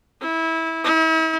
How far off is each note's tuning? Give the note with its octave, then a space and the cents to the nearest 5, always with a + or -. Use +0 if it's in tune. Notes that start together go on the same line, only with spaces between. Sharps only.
E4 -20
E4 -40